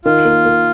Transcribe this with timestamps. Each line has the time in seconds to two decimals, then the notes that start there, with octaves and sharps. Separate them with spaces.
0.05 D#3 F4
0.25 A#3
0.45 A#3